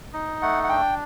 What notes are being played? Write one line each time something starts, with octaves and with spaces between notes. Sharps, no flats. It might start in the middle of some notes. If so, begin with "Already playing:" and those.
D#4
A3 F#5
F#5
D4 G5